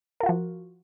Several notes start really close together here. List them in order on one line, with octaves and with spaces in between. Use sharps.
A#4 F4 F#4 F3